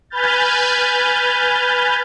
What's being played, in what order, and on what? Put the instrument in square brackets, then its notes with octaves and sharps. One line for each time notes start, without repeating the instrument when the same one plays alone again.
[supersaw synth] B4 G#5 B5 F6 G6 A6